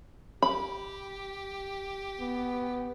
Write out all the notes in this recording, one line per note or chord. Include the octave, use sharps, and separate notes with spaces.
G4 B5
B3